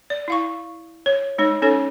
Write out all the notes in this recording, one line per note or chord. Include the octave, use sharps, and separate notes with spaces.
D5
E4 F5 C#6
C#5
G#3 D#4 C#5
C#4 D#4 A4 C#5